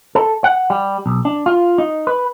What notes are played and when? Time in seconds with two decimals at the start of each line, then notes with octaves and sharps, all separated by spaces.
0.15 A4
0.44 F#5
0.70 G3
1.06 B1
1.25 D4
1.46 F4
1.78 D#4
2.07 B4